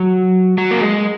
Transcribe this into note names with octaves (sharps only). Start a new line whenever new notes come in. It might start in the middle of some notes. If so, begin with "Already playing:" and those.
Already playing: F#3
F#3
A#3
G#3